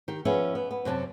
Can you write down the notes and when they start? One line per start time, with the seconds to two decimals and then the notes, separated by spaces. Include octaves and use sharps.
0.08 D#3 G4
0.25 F3 B3 C#4 G#4 E5
0.55 B3
0.71 B3
0.85 F#2 C3 G#5 A5